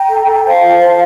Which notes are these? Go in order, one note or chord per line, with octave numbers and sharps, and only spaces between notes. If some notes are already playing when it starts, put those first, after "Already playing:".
Already playing: G5 A#5
A4
A4
C5 F5 A5
F4
C5